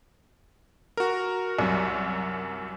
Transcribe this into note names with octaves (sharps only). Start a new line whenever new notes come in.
F#4 A#4
C2 F#2